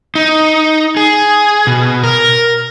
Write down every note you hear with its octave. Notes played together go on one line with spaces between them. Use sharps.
D#4
G#4
B2
A#4